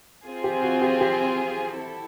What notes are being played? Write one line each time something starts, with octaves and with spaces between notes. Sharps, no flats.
C4 F4 G#4
G4
F#4
G4
G4
E4 A4